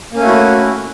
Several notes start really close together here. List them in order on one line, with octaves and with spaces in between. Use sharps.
A#3 C#4 A3 F#4 E4